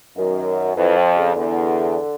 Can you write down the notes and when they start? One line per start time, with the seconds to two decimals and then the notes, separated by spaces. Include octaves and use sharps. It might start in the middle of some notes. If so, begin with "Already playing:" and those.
0.17 F#2 D#3
0.76 F2 E3
0.96 F3
1.16 C#3
1.35 E2 D3